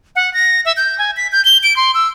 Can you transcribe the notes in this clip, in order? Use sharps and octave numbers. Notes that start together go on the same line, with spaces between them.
F#5
A#6
E5
G6
G#5
B6
G6
G7
D7
C6
E6